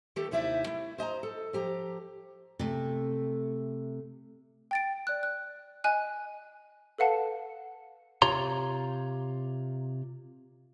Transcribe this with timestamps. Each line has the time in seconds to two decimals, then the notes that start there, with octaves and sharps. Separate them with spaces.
0.16 D#3 A3 G4 A4
0.31 D#2 C3 D#4 E4 D5 E5
0.67 A3 E4
0.98 C5 D#5 G#5 A#5
1.23 A4
1.53 F3 G4 A#5
2.59 C3 A3
4.71 G5 A6 D7
5.07 D5 F#6
5.23 F#6
5.84 D#5 G#5 F#6
6.98 A4 B4 F5 F#5 A5
8.22 C3 F4 G4 C#5 A#5 C6